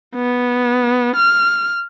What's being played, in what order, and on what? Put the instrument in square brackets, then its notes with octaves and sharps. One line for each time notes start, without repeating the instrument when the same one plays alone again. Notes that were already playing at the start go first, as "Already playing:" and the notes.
[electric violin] B3
F6